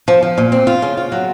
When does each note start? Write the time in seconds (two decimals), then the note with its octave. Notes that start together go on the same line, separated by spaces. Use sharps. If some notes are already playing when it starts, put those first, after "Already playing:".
0.08 F3
0.23 F3
0.38 A#2
0.52 C4
0.67 F4
0.82 C#3
0.97 F4
1.12 F#3